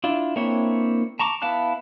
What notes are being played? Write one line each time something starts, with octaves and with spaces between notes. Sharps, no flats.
D4 E4 F4
A#3 C4 D4 E4 C#5
A5 A#5 C#6 D6
B3 E4 F5 A5 F#6